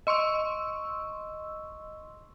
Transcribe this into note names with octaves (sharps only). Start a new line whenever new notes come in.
D#5 C6 C#6 E6